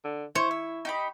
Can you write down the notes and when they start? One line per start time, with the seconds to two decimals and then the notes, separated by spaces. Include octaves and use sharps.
0.05 D3
0.35 E4 C5 C#5
0.51 E5
0.85 D#4 G4 B5